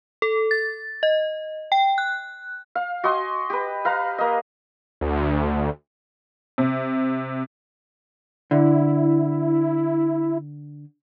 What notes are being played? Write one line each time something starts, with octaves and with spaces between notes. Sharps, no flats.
A4
A6
D#5
G5
F#6
F5
F#4 D#5 G#5 C6
G4 B4
B4 F5 A#5
A#3 D#5
D2
C3
D3 E4